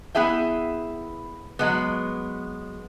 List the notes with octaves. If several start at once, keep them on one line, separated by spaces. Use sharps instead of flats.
B3 E4 G#4 E5 G5
F#3 G#3 B3